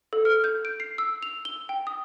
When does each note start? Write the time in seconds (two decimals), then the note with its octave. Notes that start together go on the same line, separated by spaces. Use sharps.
0.13 A4
0.25 F6
0.44 G6
0.65 D7
0.80 C7
0.98 E6
1.23 F7
1.45 G7
1.69 G5
1.87 D#6